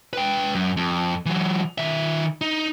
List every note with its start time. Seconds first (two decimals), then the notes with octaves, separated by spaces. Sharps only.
0.13 B4 G5
0.55 F#2
0.77 F2
1.26 E3 F#3
1.78 D#3 E5
2.41 D#4